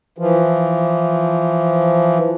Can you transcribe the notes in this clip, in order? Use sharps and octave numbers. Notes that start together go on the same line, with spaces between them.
E3 F3